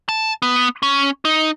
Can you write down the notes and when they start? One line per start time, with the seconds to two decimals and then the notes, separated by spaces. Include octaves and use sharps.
0.09 A5
0.42 B3
0.83 C#4
1.25 D#4